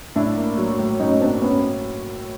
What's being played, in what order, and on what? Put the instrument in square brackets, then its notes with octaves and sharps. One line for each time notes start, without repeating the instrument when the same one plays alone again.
[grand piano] A2 [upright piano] D4 E4
[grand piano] A#3
F#3
A2
[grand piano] A2 [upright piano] C#4 D#4
[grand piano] A#3 [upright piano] C4 D4
[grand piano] F#3 [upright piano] B3 C#4